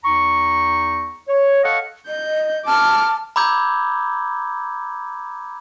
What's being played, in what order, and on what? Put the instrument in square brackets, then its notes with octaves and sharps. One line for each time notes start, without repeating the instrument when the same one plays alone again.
[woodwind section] E2 D#4 A#5 C#6
C#5
A4 C#5 D#5 F5 F#5 C#6
[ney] D#5 [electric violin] G6
[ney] A5 [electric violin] D6 F6
[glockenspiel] A#5 B5 D6 E6 G6 G#6